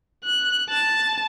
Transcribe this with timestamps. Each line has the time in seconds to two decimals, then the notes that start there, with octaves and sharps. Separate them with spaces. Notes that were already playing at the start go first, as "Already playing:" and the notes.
0.24 F#6
0.69 A5